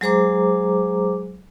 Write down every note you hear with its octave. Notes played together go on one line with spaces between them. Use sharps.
F#3 G#3 G#4 C5 A#5 D6